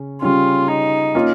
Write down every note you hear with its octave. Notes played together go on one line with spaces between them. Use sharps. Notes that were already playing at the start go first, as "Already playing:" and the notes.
Already playing: C#3 C#4
C#3 G3 C#4 F4
D#4
A#3 C#4 F4